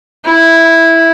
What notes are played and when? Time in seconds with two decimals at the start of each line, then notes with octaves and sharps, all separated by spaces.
0.25 E4